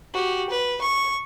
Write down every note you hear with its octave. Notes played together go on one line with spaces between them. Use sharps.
F#4 G4
B4
C#6